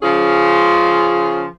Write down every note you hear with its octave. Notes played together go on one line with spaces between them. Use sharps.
C#3 F3 C#4 F4 G#4